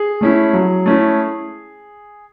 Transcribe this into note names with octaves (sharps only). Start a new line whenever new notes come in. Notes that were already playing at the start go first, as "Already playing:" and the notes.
Already playing: G#4
A3 C#4 E4
F#3
A3 C#4 E4